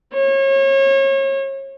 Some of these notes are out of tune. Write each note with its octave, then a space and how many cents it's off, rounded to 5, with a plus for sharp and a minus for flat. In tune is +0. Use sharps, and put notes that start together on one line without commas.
C#5 -35